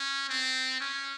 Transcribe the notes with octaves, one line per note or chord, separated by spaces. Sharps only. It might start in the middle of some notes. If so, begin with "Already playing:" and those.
Already playing: C#4
C4
C#4